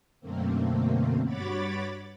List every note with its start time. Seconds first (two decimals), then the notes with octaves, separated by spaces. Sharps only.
0.20 F#2 B2 D3 A3 A#3 C4
1.25 G2 F#4 C#5 B5 D6 A6